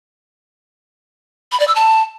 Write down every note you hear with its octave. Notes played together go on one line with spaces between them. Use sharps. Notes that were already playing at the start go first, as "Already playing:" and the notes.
B5
D5
E6
A5